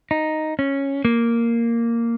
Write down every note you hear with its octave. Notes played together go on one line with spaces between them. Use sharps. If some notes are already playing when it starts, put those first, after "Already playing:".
D#4
C#4
A#3